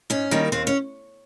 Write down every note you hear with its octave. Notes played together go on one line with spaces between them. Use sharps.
G#2 C#4
D#3 G3 A#3
D#2 C4
C#4